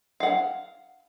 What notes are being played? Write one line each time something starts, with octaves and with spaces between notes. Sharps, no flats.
F5 F#5